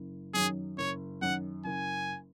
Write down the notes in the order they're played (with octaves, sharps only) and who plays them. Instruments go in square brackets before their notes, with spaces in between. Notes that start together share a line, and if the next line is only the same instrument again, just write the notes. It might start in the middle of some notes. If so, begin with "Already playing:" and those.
Already playing: [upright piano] F#1
[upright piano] F#2 D#3 F#3 [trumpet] G#4
[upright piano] F#1 [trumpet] C#5
[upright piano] F#2 D#3 [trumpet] F#5
[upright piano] F#1 [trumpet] G#5